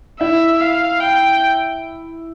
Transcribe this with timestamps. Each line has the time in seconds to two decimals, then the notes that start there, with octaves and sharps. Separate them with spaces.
0.20 E4 E5
0.61 F5
1.00 G5